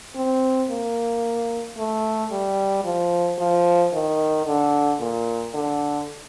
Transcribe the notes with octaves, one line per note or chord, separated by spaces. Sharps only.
C4
A#3
A3
G3
F3
F3
D#3
D3
A#2
D3